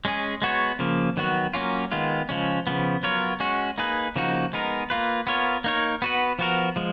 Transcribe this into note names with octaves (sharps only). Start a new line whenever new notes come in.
G#3 C#4 G#4
G#3 B3 F#4 C#5
C#3 F3 A#3
D#3 F#3 B3 F#4
F#3 A#3 C#4 F4
D#3 G#3 B3 F4
C#3 F3 G#3 C#4
C#3 F3 B3
F#3 B3 F4 A#4 C#5
G#3 C#4 F#4
A#3 D#4 G#4 B4
C#3 F3 A#3 D#4 F#4
G#3 B3 D#4 A#4
A#3 F4 B4
B3 F4 A#4 C#5
A#3 D#4 A#4 C#5
B3 F#4 B4
F3 B3 F#4 A#4
F3 G#3